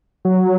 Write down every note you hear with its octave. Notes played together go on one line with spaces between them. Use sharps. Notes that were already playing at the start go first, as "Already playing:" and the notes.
F#3